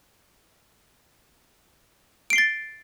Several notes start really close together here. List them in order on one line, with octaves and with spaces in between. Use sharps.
D7 C7 G7 A6